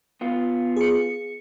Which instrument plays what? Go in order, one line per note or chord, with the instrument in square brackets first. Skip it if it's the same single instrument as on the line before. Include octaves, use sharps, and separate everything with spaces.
[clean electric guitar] B3 F4
[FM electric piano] G#4 C#7